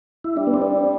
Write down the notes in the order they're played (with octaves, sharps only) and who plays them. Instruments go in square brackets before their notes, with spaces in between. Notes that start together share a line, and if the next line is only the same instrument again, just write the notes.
[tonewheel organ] E4
[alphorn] G3 [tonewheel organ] D4
[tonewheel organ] B3
C4
D4